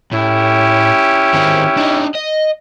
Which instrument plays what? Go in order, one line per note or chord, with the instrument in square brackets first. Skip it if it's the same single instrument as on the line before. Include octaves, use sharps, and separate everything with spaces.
[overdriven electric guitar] A2 [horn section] C#4 E4 G4
[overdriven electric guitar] D#3 C4
D4 D#4
D#5